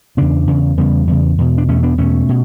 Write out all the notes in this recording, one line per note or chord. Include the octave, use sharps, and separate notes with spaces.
E2 C#3 B3 D4
E2 C#3
E2 C#3 G3 B3
E2 C#3
E2 B2
D4
E2 B2 A3 C#4
B3 D4
E2 B2 A3 C#4
B2